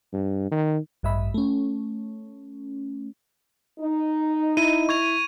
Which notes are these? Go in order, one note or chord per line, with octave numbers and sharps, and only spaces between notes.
G2
D#3
A1 G2 D#5 E5 B5
A3 C#4
D#4
E4 D#7
C#6 G#6 F7